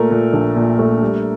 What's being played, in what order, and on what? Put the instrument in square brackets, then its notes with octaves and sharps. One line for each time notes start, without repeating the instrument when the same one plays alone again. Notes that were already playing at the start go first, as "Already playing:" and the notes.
Already playing: [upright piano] A#2 A3 A#4
A#2
A#1
A#2
A3
G3